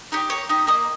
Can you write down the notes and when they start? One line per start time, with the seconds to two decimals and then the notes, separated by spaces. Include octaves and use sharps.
0.12 D#4 G4 C#5
0.30 A#3 C#5
0.49 D#4 G4
0.67 A#3 D#5